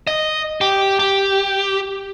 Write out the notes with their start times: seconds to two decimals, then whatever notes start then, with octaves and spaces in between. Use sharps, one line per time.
0.07 D#5
0.61 G4
0.99 G4